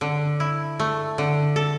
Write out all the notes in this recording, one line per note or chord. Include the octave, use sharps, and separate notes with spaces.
D3
E4
A3
D3
A4